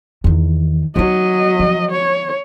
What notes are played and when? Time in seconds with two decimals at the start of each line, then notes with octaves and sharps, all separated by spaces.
0.24 E2 D#3
0.96 F#3 C#4 D#4 D#5
1.59 F3
1.91 C#5